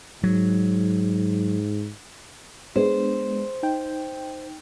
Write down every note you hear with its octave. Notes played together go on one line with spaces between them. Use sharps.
G#2 F#3
G#3 B3 D4 G#4 C5
D#4 G5